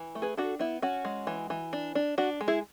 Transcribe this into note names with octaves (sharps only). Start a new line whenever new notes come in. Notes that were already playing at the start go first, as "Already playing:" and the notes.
Already playing: E3
A3
G#4 B4
D4 F#4 A4
B3 E4
C#4 F#4
G#3
E3
E3
D4
D4
D4 F#4
G#3
E4 G#4